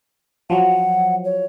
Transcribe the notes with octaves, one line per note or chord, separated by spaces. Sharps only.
F3 F#3 F#5
C#5